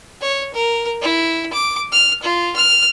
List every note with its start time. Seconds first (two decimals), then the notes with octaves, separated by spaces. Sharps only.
0.21 C#5
0.54 A#4
1.02 E4
1.53 D6
1.92 F6
2.23 F4
2.56 F6